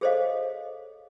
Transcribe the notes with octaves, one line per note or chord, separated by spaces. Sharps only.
G#4 A4 C5 C#5 D#5 F5